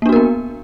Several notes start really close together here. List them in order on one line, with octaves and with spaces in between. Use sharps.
A#3 D4 F#4 A#4 B3